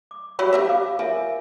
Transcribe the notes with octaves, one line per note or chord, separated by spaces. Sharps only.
D6
F#3 G3 E4 F#5
G4 A#4 E5
C#5 F5 D6
F3 A#4 E5 G#5